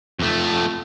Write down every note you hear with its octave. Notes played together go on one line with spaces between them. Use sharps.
F2 A3